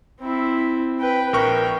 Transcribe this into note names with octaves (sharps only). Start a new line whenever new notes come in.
C4 E4
B4 G5
A#1 A#4 G5 C#6